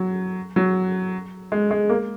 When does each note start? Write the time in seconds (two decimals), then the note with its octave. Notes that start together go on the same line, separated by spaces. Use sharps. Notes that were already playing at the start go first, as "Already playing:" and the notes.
Already playing: F#3
0.56 F#3
1.52 G#3
1.71 G#3
1.89 A#3